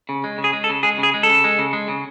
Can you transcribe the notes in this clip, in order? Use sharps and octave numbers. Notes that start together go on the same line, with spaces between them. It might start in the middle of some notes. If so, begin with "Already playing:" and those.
C#3
G#3
C#3
G#4
G#3
A4
C#3
G#3 G#4
C#3
G#4
G#3
A4
C#3
G#3
C#3
G#3
C#3